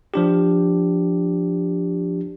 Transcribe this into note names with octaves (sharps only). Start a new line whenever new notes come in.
F3 D4 G4